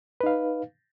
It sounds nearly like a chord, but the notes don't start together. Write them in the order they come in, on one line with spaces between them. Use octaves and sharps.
B4 D#4 F5